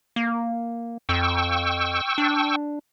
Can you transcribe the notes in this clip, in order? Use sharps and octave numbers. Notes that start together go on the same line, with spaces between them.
A#3
F2 G5 C#6 E6
D4